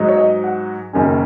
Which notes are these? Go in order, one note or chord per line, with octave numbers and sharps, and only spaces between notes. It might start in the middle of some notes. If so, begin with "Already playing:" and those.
Already playing: G#2 F#3 D#4
C#5
D#5
F#5
F#1 F#2 D#3 A#3 C#4